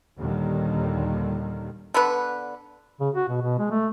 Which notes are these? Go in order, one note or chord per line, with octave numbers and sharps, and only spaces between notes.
D#2 A#2 D3 D#3 G3
D3 B3 B4
C#3
F#4
B2
B2
G#3
A3